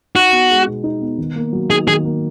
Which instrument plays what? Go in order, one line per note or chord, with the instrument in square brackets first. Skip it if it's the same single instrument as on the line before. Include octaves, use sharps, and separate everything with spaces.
[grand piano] D#4 [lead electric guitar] F#4
[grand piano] B3
G#3
B2
D#4
B3
D#3
A#3
F#3
[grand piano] D#3 [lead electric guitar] G#4
[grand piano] D#3 [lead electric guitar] G#4
[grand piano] A#3